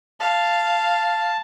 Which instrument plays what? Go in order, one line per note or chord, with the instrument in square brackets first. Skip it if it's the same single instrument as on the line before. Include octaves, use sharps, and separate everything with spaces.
[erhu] F5 [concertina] A5